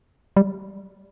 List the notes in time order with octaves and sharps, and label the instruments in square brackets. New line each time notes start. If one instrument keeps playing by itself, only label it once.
[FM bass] G3